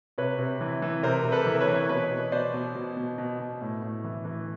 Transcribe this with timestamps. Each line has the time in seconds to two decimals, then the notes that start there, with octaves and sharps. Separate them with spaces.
0.18 C3 B4 C#5
0.39 C3
0.61 E3
0.82 E3
1.03 C3 A#4 C5
1.24 C3
1.32 A4 B4
1.47 E3
1.60 B4 C#5
1.68 E3
1.89 B2 B4 C#5
2.11 B2
2.32 B2 C5 D5
2.54 B2
2.75 B2
2.97 B2
3.18 B2
3.40 B2
3.61 A2
3.82 A2
4.04 E3
4.25 E3